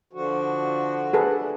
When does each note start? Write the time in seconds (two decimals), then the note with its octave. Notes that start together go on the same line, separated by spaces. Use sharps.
0.13 D3 F3 F#4
1.13 D4 G#4 A4 B4